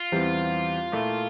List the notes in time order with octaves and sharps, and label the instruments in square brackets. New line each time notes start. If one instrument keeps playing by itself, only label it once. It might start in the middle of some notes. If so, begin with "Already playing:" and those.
Already playing: [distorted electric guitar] F4
[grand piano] E2 E3 G3 C4 G4
A#2 A3 E4